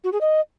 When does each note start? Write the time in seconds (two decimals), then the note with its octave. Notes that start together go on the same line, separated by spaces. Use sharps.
0.04 F#4
0.12 G#4
0.21 D#5